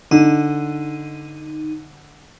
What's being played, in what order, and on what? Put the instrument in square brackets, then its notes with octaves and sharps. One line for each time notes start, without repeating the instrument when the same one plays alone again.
[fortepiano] D3 [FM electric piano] D#4